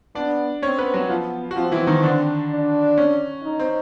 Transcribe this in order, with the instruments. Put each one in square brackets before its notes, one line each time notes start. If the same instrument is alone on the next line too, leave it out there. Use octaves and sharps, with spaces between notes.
[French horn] B3 [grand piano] D4 D5
[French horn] C4 [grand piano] C#4 C#5
[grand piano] B3 B4
F#3 F#4
[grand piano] F3 F4 [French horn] B3
[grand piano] F#4
[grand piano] F3 F4 [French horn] C4
[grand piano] E3 E4
D#3 D#4
D3 D4
[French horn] D4
[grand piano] C#4
[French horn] D#4
[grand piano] C4